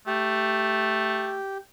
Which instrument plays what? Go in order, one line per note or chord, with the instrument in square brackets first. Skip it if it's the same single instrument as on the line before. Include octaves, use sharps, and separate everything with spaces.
[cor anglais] A3 [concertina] G4